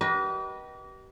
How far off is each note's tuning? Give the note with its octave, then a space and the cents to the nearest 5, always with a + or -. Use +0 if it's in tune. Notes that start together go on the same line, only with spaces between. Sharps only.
G4 -40 B4 -30 D#5 +0